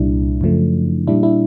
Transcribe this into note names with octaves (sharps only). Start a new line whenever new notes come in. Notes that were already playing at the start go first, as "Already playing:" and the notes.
Already playing: C2 A#2 G3 D4 E4
F#2 C#3 F3 A3
A#2 G3 D4 E4
D4 E4